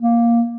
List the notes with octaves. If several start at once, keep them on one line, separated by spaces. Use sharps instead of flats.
A#3